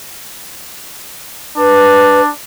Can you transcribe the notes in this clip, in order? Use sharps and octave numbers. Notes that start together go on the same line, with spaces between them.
D4 B4